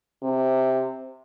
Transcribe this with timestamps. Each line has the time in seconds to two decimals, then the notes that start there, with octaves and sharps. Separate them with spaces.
0.22 C3